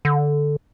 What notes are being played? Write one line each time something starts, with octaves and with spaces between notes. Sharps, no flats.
D3